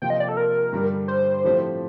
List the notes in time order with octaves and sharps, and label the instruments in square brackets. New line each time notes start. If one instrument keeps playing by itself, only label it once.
[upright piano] C3 F3 A#3 F4 [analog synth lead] G5
[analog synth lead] D#5
D5
A4
A#4
[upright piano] G2 D3 G3 D4
[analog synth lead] C5
[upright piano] A2 F3 A3 C4 G4